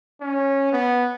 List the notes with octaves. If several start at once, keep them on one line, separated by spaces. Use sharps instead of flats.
C#4
B3